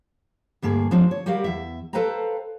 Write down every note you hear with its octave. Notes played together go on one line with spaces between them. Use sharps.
D2 G2 A#3 G#4
F3 G#3 C4 D4 D#4
C#5
G3 F#4 G4 A#4 F5
E2 E5
A4 B4 C5 F5 G5 A#5